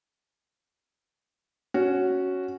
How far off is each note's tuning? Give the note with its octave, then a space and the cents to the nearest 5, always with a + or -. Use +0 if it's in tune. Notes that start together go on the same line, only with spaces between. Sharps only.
C#4 +0 F#4 +0